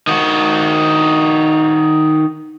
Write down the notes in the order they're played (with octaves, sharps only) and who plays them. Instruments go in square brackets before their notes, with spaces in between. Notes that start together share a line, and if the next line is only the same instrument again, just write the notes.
[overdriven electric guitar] D#3 F#4